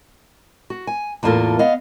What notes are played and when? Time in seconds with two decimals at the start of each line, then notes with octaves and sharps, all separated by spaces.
0.70 F#4
0.87 G#5
1.23 E2 A2 A#3 F4 A4 A#4
1.59 B3 D#5 F5